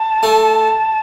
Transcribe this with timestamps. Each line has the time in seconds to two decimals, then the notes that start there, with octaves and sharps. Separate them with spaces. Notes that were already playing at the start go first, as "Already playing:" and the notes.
Already playing: A5
0.23 A3